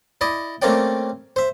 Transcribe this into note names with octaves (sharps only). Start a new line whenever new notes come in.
E4 D5 D#5
A3 A#3 C4 C#4 D5 G5
C5 E5